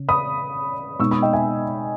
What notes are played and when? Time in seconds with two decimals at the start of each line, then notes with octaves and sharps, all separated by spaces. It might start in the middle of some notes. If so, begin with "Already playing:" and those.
Already playing: C#3 C#4
0.09 B5 D#6
0.99 B2 G#3 D#4 C#6 E6
1.11 B5 D#6
1.22 D#5 G5
1.33 E5 G#5